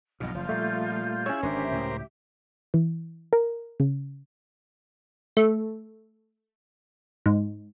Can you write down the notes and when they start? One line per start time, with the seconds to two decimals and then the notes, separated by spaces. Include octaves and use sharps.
0.20 B1 G2 B2 F3 D#5
0.34 F#1 F4 G6
0.49 A#2 G3 A3
1.26 C#4 E4 G#4 C#5 E5
1.43 G#1 D3 D4 G4 A#4 C5 E5
1.71 C#2 A2
2.74 E3
3.33 A#4
3.80 C#3
5.37 A3
7.26 G#2